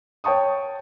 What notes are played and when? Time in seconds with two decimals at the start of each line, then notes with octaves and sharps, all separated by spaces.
0.24 C#5 G5 A5 C#6 D#6